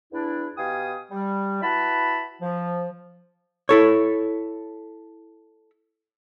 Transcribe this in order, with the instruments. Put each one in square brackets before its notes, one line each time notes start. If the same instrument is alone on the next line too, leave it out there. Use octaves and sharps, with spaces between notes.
[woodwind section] E2 D4 E4
B2 G4 F5 G#5 D#6
G3
E4 F#4 B4 A5 B5
F3
[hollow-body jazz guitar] E4 A4 C#5